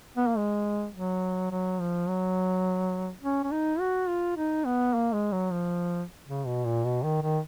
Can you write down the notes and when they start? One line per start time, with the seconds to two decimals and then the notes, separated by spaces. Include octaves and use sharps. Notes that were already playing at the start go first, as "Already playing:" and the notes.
0.17 B3
0.27 A#3
0.37 G#3
0.95 F#3
1.51 F#3
1.80 F3
2.08 F#3
3.22 C#4
3.44 C#4
3.51 D#4
3.80 F#4
4.08 F4
4.37 D#4
4.65 B3
4.94 A#3
5.13 G#3
5.32 F#3
5.51 F3
6.28 C#3
6.46 B2
6.65 A#2
6.84 B2
7.03 D#3
7.22 D#3